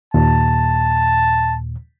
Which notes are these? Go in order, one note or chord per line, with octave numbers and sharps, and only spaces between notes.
D#2 A#2 A5